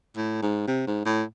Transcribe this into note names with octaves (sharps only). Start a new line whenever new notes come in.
A2
G#2
C3
G#2
A2